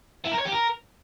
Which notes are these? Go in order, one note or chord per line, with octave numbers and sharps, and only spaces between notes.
E4
A#4
C#5
G4
A#4